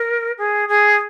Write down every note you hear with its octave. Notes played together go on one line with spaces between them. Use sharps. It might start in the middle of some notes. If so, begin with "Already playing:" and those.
Already playing: A#4
G#4
G#4